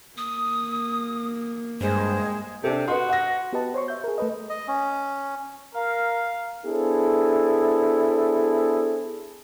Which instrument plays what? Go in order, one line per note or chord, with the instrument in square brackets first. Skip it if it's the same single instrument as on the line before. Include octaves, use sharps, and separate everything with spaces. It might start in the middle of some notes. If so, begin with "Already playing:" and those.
[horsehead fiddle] A#3 [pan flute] D#6
[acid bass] G2 [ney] G#3 [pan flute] C5
[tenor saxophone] C3 [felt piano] D4 A4
[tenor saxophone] F#4 [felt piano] B4 D#5 C6
[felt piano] F#5 A#6
[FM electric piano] B3 F#4 G4 B4 D#5 A5
C5 C#5 C6 C#6
E5 G6
G#4 A#4
A3 A4 B4 D#5
[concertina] D#5
C#4
[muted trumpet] A#4 [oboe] F5
[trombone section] B3 D4 E4 G#4 A4 C5